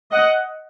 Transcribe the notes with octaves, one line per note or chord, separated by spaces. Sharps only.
D#5 F#5